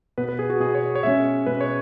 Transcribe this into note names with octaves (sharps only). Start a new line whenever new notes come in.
B2 B3 B4
B4
G#4
F#4
B2 B3 G#4
C#5
C#5
B2 G#3 C#4 E5
B2 G#3 C#4 B4
C#5